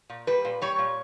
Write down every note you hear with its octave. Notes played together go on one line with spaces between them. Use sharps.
A#2
G3 B4
A#2
G3 C#5
A#2